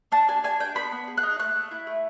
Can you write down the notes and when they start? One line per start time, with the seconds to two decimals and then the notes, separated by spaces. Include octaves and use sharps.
0.12 D4 A5
0.28 D4 G#5
0.44 D4 G#5
0.60 D4 G5
0.75 B3 B5
0.92 B3
1.07 G#4
1.17 F#6
1.23 D#4
1.39 A3 F#6
1.56 A3
1.71 E4
1.87 A3